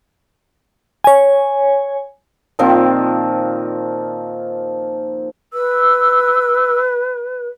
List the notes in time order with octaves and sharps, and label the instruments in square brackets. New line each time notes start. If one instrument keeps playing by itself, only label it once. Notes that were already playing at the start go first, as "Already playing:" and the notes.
[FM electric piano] C#5 G#5
[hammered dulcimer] A#2 D#3 F3 C4
[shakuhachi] B4 [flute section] E6